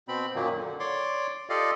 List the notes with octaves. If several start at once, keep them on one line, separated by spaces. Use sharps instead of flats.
B2 C4 B5
F#2 A#2 D#3 F#3 A#3
D3
C#5 D5 C6 D6
F4 G4 A4 D5 D#5 F5